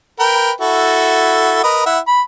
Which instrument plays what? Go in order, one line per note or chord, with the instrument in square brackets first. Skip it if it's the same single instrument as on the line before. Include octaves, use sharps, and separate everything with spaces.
[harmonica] A#4 B4 G5
E4 F#4 A4
A#4 B4 D#5
E4 E5 F#5
B5